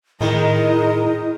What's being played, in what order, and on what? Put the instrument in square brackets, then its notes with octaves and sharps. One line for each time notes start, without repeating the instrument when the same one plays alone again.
[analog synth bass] A2 [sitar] D#3 G#3 [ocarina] E4 [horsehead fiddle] A#4 D#5